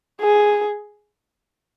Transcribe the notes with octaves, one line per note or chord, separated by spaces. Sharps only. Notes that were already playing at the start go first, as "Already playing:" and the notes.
G#4